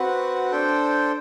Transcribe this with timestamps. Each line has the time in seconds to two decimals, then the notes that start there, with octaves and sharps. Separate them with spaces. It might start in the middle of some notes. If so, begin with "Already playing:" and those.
Already playing: C4 F#4 B4 F#5
0.51 D4 A4 C5 G5